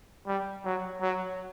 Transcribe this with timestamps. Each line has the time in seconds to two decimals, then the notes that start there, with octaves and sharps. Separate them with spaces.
0.27 G3
0.65 F#3
1.01 F#3